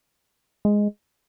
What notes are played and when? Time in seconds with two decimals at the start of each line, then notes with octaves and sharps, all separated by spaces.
0.65 G#3